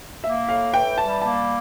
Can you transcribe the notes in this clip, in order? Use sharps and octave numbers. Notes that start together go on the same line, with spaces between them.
A#3 E5
A2 F5
E3 G5
G3 A5
A#3 A5